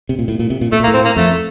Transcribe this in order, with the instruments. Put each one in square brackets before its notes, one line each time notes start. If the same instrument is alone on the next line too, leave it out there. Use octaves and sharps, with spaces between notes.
[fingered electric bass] C3
A#2
A2
A#2
C3
A#2
[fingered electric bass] A2 [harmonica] A3
[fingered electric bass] A#2
[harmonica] A#3
[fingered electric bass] A2
[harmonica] C4
A#3
[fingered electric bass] F2 [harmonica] A3